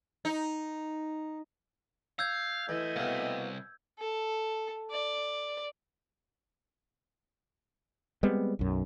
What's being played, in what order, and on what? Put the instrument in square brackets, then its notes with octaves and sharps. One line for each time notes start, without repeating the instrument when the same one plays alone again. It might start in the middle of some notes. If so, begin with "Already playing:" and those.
[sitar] D#4
[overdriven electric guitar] F5 [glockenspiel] E6 G6 G#6
[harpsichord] E3 [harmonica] A3 E4 D#5
[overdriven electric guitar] C2 [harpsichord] B2 A#3
[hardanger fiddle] A4
D5
[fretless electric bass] G3 G#3 B3 C4
B1 F#2